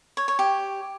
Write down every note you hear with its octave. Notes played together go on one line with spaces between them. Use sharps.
C#5
C#5
G4